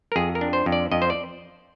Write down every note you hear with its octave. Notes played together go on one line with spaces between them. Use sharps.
A#4
F2 G#4
A#4
D4
C5
F2
D5
F2 D#5
C5
D5